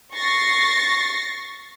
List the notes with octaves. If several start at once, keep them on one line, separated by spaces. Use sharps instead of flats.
C#6 A6 A#6 C7